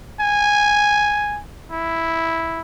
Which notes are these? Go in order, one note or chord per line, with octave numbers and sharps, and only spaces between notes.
G#5
E4